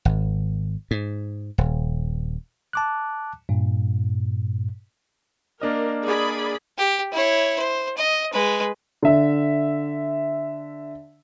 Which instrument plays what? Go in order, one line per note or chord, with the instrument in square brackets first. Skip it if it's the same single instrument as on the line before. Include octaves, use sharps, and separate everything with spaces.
[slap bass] G#1
G#2
D#1
[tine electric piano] A5 D6 F#6
G2 A#2
[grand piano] A#3 D4 D#5 [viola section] A#4
[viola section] G#4 D5 B5
[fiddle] G4
E4 C#5
C5
D#5
G#3 B4
[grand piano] D3 E5